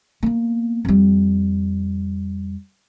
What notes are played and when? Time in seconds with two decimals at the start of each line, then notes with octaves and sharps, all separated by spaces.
0.23 A#3 B3
0.85 F2 G3